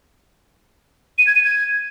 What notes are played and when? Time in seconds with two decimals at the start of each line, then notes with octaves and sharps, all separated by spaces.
1.18 D#7
1.27 G#6
1.35 D#7
1.44 G#6